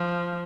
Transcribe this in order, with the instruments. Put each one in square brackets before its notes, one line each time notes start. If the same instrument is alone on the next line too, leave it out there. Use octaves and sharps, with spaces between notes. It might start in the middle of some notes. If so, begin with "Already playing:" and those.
Already playing: [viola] F3